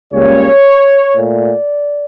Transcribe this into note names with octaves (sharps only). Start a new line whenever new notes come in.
C#2 C#3 G3 A#3 C#5
A#2 A3 D5